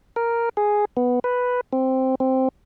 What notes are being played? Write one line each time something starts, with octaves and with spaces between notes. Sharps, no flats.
A#4
G#4
B3
B4
C4
C4